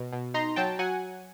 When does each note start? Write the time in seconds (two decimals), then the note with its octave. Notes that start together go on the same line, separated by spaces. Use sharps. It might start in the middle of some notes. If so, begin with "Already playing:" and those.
Already playing: B2
0.13 B2
0.34 D#4 A#5 C6
0.56 F#3 G5 A5
0.79 F#3 F#5 G#5